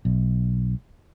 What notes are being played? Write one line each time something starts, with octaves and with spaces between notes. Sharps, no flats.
B1